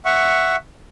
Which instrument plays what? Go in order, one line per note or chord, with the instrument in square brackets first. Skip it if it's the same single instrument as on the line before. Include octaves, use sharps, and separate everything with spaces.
[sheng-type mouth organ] E5 F#5 C#6